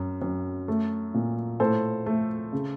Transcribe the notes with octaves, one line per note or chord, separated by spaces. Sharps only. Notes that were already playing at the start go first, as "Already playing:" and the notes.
Already playing: F#2
F#2
A3
A#2
A2 A4 C5
A3
C#3